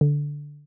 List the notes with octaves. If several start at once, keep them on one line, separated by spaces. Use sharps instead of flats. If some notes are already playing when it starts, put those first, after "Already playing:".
D3